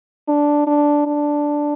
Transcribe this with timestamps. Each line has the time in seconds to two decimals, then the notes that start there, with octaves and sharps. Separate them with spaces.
0.28 D4
0.67 D4
1.07 D4